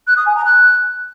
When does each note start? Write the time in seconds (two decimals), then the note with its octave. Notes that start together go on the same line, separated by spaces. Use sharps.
0.07 F#6
0.16 D#6
0.26 G#5
0.35 A#5
0.45 F#6